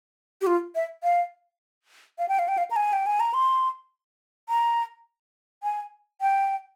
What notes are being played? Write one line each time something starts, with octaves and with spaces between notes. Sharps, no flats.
G4
F4
E5
F5
F5
G5
F5
G5
F5
A#5
G#5
G5
G#5
A#5
C6
A#5
G#5
G5